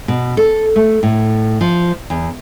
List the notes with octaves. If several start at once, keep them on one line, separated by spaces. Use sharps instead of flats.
B2
A4
A3
A2
F3
E2